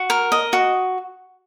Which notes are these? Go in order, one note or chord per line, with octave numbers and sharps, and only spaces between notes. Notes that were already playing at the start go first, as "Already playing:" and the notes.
Already playing: F#4
A#4
D#5
F#4